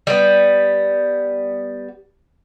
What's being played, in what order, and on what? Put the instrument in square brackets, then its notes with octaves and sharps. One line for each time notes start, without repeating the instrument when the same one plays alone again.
[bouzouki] G3 B3